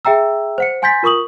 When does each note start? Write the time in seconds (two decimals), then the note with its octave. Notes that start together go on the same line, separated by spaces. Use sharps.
0.05 G#4 E5 G5 A#5 E6
0.58 C5 F#5 C#7
0.82 F#5 G#5 C6 G6 A6 B6
1.03 F4 A#4 C#6 D#6 F#7